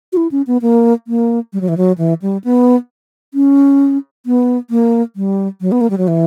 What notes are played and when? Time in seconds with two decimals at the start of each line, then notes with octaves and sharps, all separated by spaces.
0.13 F#4
0.17 E4
0.31 C#4
0.47 B3
0.62 A#3
1.07 A#3
1.53 G3
1.61 F#3
1.68 E3
1.77 F#3
1.98 E3
2.22 G3
2.44 B3
3.34 C#4
4.26 B3
4.70 A#3
5.16 G3
5.61 F#3
5.72 B3
5.81 A#3
5.90 G3
5.98 F#3
6.08 E3